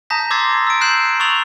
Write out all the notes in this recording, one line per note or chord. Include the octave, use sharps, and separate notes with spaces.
A5 A#5 D#6 G6 A#6 B6
C6 D6 E6 G#6 A6 C7
E6 D7
F#6 G6 C7 E7 F#7
C#6 D#6 E6 A6 F7 F#7